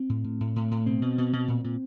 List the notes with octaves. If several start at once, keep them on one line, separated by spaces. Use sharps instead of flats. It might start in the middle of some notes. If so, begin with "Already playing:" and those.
Already playing: C4
A2
A2
A2
A2
A2
B2 C4
B2
B2
B2
A#2
A#2